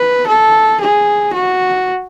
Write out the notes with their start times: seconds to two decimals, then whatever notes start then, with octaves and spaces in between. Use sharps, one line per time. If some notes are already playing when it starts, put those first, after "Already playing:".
Already playing: B4
0.27 A4
0.81 G#4
1.34 F#4